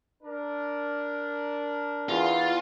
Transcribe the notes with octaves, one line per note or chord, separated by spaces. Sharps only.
D4 A#4
E2 F4